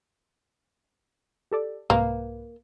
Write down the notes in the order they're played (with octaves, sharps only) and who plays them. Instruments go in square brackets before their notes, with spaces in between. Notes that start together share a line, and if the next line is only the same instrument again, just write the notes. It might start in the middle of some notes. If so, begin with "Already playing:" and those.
[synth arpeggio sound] G4 A4 D5
[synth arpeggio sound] C2 G#2 B4 [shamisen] A#3